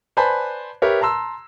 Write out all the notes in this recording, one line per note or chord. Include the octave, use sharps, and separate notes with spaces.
B4 C5 D5 G#5 A5 B5
G4 A#4 B4 C#5 E5
A5 A#5 C6 E6